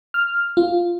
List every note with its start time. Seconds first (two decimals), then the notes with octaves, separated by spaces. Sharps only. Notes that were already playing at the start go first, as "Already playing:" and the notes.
0.14 F6
0.57 F4